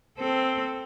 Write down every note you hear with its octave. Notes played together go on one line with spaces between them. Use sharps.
C4 A4